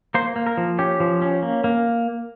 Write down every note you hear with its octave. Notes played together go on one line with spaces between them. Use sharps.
A#3 C5
A#3
A#4
F3
C#4 G4
F3
C#4
A#3
A#3